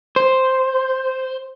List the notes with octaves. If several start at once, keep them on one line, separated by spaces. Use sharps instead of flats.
C5